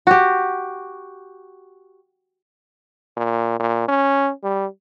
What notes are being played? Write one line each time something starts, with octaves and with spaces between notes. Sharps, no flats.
F#4 G4
A#2
A#2
C#4
G3